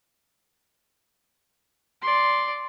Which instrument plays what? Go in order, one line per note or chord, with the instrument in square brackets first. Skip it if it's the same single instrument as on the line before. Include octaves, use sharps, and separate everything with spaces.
[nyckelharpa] D5 C6